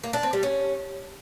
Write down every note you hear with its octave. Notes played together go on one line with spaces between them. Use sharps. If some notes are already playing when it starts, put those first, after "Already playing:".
A#3
D4
C4
G3
C#4